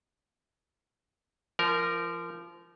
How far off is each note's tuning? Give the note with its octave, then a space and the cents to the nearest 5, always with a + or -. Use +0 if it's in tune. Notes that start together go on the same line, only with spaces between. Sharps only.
F3 -30 A#4 +0